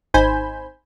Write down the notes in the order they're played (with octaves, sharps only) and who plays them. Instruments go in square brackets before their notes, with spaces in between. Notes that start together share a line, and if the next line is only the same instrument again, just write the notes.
[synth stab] G#1 D#4 C5 G#5 B5 G6